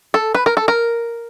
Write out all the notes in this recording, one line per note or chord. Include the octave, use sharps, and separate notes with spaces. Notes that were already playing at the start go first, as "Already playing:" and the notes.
A4
B4
A#4
A4
A#4